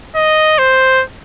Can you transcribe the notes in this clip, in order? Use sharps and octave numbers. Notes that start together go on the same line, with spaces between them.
D#5
C5